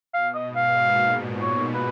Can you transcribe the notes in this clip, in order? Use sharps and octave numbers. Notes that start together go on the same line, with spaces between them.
B2 F5
D#5
G#2
F5
A#2
A#2
C#5
B4